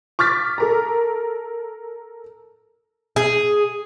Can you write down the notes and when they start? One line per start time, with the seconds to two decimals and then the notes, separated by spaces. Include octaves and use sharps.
0.19 C#6 D6 F6 A6 B6
0.58 A4 A#4 A#5
3.16 G#4